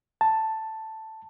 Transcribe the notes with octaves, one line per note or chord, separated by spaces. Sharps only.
A5